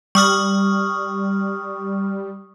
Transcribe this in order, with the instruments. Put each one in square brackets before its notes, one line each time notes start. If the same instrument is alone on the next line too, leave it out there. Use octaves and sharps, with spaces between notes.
[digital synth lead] G3 [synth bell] C#6 D#6 F6